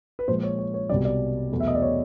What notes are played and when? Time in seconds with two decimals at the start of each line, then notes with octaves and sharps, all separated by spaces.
0.19 B4
0.28 A#2 F3 G#3 C5
0.43 C#5
0.59 C#5
0.74 C#5
0.89 C2 B2 G3 D5
1.05 D5
1.51 E2 B2 F#3 A3
1.60 E5
1.67 D#5
1.75 D5
1.82 C#5